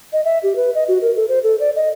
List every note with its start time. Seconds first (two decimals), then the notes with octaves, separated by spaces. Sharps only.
0.13 D#5
0.25 E5
0.43 G4
0.56 B4
0.75 D#5
0.88 F#4
1.02 A#4
1.16 A4
1.29 C5
1.43 A4
1.60 D5
1.76 D#5